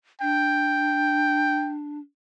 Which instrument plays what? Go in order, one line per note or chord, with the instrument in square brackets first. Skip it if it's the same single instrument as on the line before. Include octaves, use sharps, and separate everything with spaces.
[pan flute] D4 [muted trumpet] G5